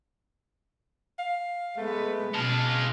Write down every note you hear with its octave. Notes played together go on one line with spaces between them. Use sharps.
F5
G#3 A3 B3 B4
B2 G#3 F4 A5